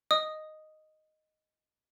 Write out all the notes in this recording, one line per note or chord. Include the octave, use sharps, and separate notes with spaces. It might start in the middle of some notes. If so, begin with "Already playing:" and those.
D#5 D#6